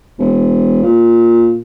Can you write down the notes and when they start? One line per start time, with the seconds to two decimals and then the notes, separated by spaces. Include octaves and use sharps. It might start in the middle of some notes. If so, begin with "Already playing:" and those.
0.19 E1
0.83 A#2